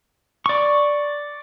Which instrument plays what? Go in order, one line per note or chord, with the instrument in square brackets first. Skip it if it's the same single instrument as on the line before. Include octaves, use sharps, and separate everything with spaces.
[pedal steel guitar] D5 C#6